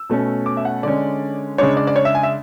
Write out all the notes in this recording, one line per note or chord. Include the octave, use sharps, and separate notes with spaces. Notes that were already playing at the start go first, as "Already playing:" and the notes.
Already playing: E6
B2 A3 C#4
D6
E5
F#5
D3 G#3 C#4 D5
C#3 G#3 D4 C#5
D5
D5
C#5
E5
G#5
E5